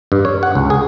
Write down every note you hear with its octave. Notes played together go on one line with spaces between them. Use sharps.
G2
C#5
F#5
C#2
G#4